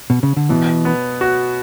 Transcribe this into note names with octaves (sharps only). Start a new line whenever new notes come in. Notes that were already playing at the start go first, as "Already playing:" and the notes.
B2
C#3
D3
B2 E3
B3
F#4